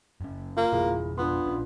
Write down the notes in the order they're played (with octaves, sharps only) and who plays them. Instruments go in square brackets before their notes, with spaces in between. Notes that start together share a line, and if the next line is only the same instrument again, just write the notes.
[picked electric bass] F#1 C#4
[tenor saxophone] A#3 [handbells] F4
[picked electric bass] F2 B2 [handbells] E4 G#4
[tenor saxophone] B3 [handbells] D4 F4 C6
[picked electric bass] A#1 C#4